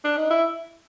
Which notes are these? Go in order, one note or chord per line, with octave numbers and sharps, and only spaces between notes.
D4
D#4
E4